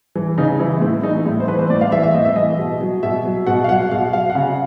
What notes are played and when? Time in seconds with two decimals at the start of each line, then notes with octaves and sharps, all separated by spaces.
0.15 E3
0.38 C#3 D#4
0.59 E3 E4
0.81 A2 E4
1.03 E3 D#4
1.26 A2 E4
1.40 C5
1.48 E3 B4
1.59 C5
1.70 A2 D5
1.81 F5
1.92 E3 E5
2.03 E5
2.14 A2 D#5
2.25 E5
2.36 E3 D#5
2.59 B2
2.81 F#3
3.03 B2 E5
3.25 F#3
3.46 B2 F#5
3.64 F5
3.69 F#3 F#5
3.80 F#5
3.91 B2 F5
4.13 F#3 F5
4.30 F#5
4.35 C#3 F5